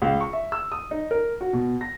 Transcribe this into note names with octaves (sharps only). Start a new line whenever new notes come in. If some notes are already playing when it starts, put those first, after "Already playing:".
C#2
C#6
E5
E6
D#6
D#4
A#4
F#4
B2
A#6